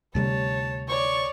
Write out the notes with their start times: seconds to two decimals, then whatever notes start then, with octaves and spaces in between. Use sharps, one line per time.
0.15 D2 C3 G3 C#5 A5
0.88 C#5 D5 C#6